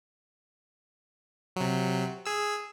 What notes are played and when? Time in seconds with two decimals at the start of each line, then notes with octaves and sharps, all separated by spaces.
1.56 C3 F#3
2.26 G#4 E6